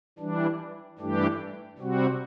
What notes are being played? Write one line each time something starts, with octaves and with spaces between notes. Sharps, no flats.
E3 G3 D4
G2 E3 A3 D4 G4
C3 G3 C4 F#4